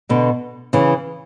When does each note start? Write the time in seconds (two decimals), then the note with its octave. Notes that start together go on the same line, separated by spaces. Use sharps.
0.09 B2 D3
0.73 C#3 E3